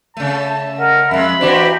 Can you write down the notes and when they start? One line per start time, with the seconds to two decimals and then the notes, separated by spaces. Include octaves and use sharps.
0.17 C#3 A3 A5
0.77 A#4 D#5 F#5
1.11 F2 G#3 E5 B5
1.41 E3 A#3 D4 F#4 G4 C5 D#5